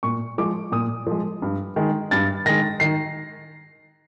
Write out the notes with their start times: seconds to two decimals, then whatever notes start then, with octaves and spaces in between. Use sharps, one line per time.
0.03 A#2 C#6
0.38 F3 G#3 D6
0.72 A#2 D#6
1.07 F3 G#3
1.42 G2
1.76 D#3 G#3
2.11 G2 A6
2.46 D#3 G#3 A#6
2.80 D#3 C7